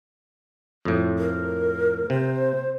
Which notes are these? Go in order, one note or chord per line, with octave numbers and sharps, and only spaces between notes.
F2 A2
A#4
C3 C5